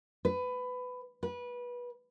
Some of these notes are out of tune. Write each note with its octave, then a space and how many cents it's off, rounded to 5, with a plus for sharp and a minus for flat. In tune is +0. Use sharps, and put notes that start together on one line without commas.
B4 +20
B4 -20